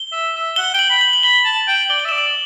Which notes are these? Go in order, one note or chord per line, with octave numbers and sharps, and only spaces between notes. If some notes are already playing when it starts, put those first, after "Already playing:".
Already playing: G7
E5
E5
F#5 G7
G5 G7
F#7
B5
F#7
F#7
B5 G7
A5
G5
D5 G7
F#7
E5
D5 E7
F#7